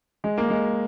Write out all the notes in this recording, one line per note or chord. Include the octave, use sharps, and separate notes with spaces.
G#3
A#3
G#3